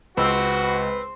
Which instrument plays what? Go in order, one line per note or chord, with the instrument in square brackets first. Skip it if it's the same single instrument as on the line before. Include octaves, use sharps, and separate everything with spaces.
[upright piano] C#2 [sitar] C4 [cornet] F#4 [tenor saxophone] B4